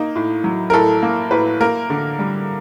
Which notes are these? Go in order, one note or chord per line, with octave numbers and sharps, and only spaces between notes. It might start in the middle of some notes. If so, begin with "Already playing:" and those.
Already playing: A#3 D#4
A2
F#3
A#4
A2 A4
A#3
A2 B4
A#3 A#4
D3
G3